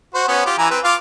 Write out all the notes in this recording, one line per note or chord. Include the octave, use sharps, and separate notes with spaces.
F#4 C5
B3 C#4
F4 G4
E3 G#5 A#5
C4 B4 C5
F4 F5 D6